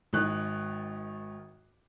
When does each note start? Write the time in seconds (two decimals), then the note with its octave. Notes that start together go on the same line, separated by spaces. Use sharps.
0.13 G#1 D#3 F#6